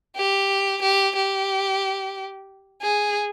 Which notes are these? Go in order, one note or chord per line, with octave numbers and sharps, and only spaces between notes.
G4
G4
G4
G#4